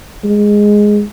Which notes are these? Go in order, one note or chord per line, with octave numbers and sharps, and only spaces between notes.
G#3